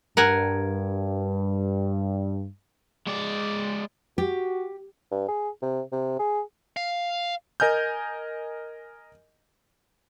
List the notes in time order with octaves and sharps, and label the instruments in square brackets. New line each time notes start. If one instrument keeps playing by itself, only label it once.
[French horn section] G2 [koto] A#4 F#5 G#5
[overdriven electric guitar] G#3 D5
[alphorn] F#4 [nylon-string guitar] G4
[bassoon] G2
G#4
C3
C3
G#4
[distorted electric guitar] F5
[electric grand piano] A#4 D#5 G#5 F6 G6